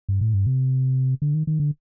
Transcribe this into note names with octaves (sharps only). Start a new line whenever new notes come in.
G2
A2
G2
C3
D3
D#3
D#3
D3